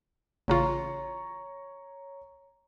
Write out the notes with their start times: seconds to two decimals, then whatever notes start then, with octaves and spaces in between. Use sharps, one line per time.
0.48 A1 C#3 F4 C#5 A#5 C#6